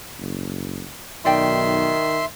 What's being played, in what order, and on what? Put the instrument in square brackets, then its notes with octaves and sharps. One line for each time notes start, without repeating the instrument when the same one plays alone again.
[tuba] F#1
[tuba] B1 [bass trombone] D#3 [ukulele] F#4 D5 G5 [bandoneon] E5 C6